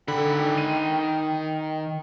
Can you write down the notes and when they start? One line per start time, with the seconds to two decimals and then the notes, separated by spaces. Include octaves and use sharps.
0.08 D3 D#3 G5 B5
0.58 D#7